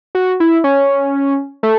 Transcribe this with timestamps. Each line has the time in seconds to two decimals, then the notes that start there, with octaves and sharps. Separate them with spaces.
0.15 F#4
0.40 E4
0.64 C#4
1.63 A3